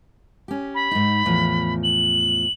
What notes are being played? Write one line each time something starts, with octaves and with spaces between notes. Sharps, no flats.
C#4 G4
B5
G#2 D#4
E2 A2 F3
F#7